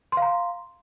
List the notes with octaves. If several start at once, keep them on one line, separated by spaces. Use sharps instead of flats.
F5 A#5 C6